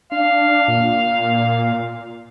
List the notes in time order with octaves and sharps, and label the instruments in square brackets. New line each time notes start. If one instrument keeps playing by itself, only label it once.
[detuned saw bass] D4 [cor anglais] F5
[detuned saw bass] A#2